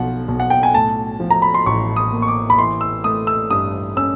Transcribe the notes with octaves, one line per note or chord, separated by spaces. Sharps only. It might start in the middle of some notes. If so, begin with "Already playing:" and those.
Already playing: B1 F3 F#5
B1
F#5
G5
G#5
A2 A5
F3
A#5
B5
C6
A1 C#6
D#6
A#3
C#6
D6
B5
E3 C6
E6
A3 D#6
E6
G2 D#6
C#4 E6